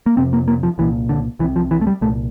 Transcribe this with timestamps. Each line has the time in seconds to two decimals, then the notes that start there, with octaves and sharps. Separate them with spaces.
0.06 A#3
0.17 F2 C3 C4
0.33 A#3
0.48 A#3
0.63 F3
0.78 C2 A#2 E3
1.09 D3
1.39 C2 E3
1.44 C3
1.56 F3
1.71 E3
1.81 A3
1.87 G3
2.01 C2 A#2 A3